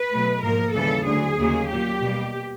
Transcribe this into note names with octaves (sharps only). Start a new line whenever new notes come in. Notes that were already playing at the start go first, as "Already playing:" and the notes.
Already playing: B4
B2 F#3 A3
G#2 F3 A#3 A#4
D#2 C#3 E3 G3 A#3 A4
D2 D3 F#3 G#4
D#2 C#3 F#3 A#3
A#2 F#3 A#3 G4
B2 G3 A#3